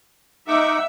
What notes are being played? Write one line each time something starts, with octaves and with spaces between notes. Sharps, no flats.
D#4 E5 F#5 D6